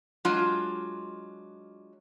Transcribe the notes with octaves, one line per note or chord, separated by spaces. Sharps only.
F#3 G#3 D4 F4